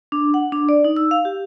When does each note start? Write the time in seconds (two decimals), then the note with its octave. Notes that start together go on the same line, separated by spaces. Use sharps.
0.12 D4
0.34 F#5
0.52 D4
0.69 D5
0.85 D#4
0.96 E6
1.11 F5
1.25 G4